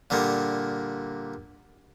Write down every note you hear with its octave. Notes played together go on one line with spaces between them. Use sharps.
A#2 D3 G3 A#3